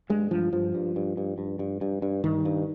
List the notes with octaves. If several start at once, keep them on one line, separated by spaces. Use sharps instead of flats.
G2 G#3
G2 F3
G2 F3
G2
G2
G2
G2
G2
G2
G2
G2 D#3
G2